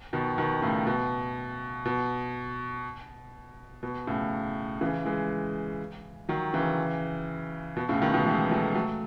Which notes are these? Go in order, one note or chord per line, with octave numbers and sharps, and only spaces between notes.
B2 D#3
B2 D#3
A2 C#3
B2
B2
B2
A2 C#3
C#3 E3
E3 G#3
D#3 F#3
C#3 E3
B2
A2 C#3
B2 D#3
B2 D#3
E3 G#3
F#3 A3
F#3 A3